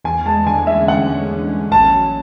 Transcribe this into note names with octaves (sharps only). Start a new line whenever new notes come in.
E2 G#5
G#3 A5
D3 G#5
C#4 E5
E2 F#5
G#3
D3
C#4
A1 A5
F#3